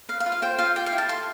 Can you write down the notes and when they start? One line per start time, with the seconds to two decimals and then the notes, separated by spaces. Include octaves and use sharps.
0.09 B4 F5
0.20 F5
0.26 F4
0.32 F5
0.42 C5 G5
0.58 F4 F5
0.76 G4 G5
0.86 F5
0.92 E4
0.98 A5
1.09 A4 C6